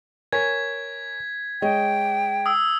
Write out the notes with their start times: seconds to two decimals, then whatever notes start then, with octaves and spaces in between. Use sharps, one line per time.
0.32 A#4 C#5 G#5 G#6 B6
1.62 G#3 C#5 D#5 G5
2.46 D#6 E6